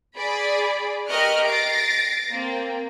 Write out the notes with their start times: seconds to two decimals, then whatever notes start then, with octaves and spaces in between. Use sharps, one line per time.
0.17 G#4 D5 B5
1.08 G4 A#4 D#5 C#6 F6 F#6
1.47 A6 A#6 C7 D7
2.31 A#3 C4